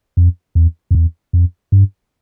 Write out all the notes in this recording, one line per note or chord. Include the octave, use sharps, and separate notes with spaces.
F2
E2
F2
E2
F2
G2